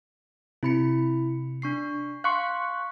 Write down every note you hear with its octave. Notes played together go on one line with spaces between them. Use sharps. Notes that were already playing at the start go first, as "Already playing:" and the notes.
C3 E4 B5 C#7
D4 C#6 C7
F5 C6 C#6 F#6